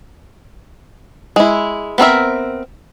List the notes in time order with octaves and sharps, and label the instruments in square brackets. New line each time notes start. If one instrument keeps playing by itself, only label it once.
[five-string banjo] G#3 E4
B3 C4 A#4 E5